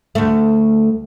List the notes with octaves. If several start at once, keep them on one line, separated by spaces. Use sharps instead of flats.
D2 A3